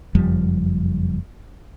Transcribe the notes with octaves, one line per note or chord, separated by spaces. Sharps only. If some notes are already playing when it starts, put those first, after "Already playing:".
F#1 F2 F3 G3